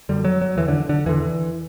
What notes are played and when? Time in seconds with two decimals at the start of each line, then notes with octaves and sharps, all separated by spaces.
0.09 F#2 D3 G3
0.24 F#3
0.42 F#3
0.57 E2 D3 E3
0.68 D3
0.89 D3
1.06 E2 D3 E3